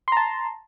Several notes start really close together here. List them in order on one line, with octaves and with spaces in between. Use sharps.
C6 A#5 A5